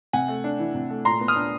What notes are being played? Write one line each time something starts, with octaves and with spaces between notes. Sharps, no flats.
C3 F#5 G#5
A3
D4
E3
C3
A3
A#2 A#5 C6
B3
D#6 F6
D4